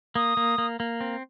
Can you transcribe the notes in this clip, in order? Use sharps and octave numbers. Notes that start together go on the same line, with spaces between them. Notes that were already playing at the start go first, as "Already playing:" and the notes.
A#3 D#6
A#3
A#3
A#3
C4